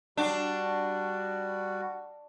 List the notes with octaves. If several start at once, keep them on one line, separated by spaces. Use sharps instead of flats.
G3 D4 F#4